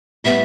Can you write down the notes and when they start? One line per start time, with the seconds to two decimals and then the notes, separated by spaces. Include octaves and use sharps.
0.24 A2 G3 B3 E5